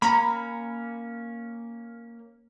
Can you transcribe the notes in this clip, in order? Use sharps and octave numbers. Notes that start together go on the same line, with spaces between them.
A#3 C#4 A#5 B5